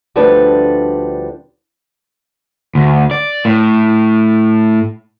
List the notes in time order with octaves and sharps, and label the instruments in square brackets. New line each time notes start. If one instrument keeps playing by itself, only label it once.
[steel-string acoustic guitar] D2 F3 G3 D4 A4 B4
[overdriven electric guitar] D2
D5
A2